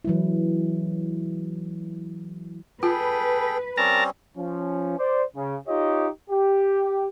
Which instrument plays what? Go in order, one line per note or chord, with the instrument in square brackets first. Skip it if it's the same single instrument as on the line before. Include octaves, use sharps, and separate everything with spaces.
[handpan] E3 F#3 G#3 E4
[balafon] F4 [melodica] G#4 A4 G5 [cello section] B4
[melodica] G3 C4 C#4 [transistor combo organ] A#4 A5 A#5
[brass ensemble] F3 C#4
C5 D5
C#3
D#4 F4 G4 C#5 D#5
G4